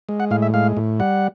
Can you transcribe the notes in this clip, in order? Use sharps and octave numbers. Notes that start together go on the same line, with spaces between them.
G#3
F#5
A2 F5
E5
G#3 F5
A2
G3 F#5